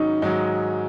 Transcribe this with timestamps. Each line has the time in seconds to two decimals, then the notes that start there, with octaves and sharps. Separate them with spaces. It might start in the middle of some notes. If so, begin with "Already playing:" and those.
Already playing: G#2 D#3 F#3 C#4 D#4
0.22 G#2 D#3 F#3 D#4